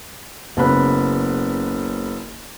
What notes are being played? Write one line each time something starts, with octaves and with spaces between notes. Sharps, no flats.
F#1 C#3 B3 B5 F#6